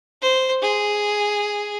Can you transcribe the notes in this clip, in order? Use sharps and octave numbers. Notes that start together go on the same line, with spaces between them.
C5
G#4